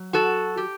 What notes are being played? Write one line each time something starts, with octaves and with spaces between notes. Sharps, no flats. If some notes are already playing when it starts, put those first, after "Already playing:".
Already playing: F#3
F#4 A4
G4